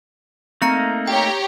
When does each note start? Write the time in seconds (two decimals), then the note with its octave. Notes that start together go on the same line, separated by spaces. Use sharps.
0.62 A3 A#3 C4 D#4 A#5 C#7
1.07 G4 C#5 G5 A#5